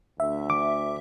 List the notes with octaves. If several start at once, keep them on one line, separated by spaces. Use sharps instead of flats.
D2 E5
D6